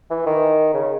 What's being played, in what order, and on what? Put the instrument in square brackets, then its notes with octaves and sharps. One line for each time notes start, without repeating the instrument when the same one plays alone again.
[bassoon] E3
D#3
C#3